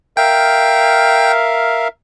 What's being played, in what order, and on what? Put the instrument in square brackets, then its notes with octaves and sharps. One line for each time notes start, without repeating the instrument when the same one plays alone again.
[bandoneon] A#4 E5 F5 [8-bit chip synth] G5